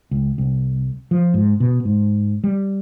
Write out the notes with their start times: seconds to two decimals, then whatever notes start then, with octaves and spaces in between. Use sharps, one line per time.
0.11 C#2
0.38 C2
1.11 F3
1.34 G#2
1.60 B2
1.85 G#2
2.44 G3